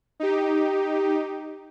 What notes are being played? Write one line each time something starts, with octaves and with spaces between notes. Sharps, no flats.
D#4 G4